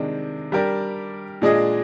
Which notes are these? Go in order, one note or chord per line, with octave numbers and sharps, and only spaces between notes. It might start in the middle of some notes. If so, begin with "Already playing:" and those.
Already playing: C3 D#3 G#3 D4
G3 D4 G4 A#4 D5
A#2 G#3 D4 G#4 D#5